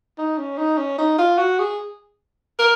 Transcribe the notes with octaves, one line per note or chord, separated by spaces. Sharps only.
D#4
C#4
D#4
C#4
D#4
F4
F#4
G#4
A#4